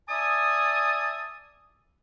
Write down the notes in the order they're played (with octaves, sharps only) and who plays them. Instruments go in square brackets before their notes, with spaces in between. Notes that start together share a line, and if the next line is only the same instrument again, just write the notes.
[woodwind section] D5 E5 G#5 A5 D#6